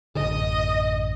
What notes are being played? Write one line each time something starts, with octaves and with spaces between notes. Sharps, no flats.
A1 F#2 D3 D#5